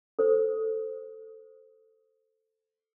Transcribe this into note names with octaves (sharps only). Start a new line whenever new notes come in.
A4 C5